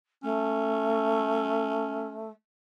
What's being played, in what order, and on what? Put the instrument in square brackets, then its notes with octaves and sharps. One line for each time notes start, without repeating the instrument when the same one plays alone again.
[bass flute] A3 [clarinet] C#4